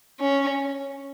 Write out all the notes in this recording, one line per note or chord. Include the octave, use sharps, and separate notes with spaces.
C#4